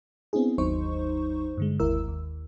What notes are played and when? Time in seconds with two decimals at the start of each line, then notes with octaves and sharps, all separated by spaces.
0.33 B3 C4 D4 E4 G#4
0.58 G1 D#2 F#3 D#4 C5 C#6
1.57 G2 D3 G#3
1.80 G1 D#2 G#3 E4 A#4 E6
2.08 D#2